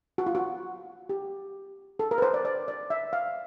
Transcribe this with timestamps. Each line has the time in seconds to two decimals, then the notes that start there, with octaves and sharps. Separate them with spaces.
0.18 F#4
0.26 F4
0.35 F#4
1.09 G4
1.99 A4
2.11 A#4
2.18 B4
2.22 C5
2.34 D5
2.45 D5
2.68 D5
2.90 E5
3.13 F5